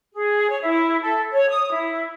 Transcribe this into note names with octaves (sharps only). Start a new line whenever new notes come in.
G#4
C#5
E4
A4
C#5
D#6
E4